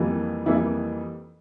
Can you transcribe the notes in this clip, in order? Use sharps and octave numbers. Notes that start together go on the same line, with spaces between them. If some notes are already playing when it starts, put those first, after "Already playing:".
Already playing: F2 E3 G3 A#3
F2 E3 G3 A#3 E4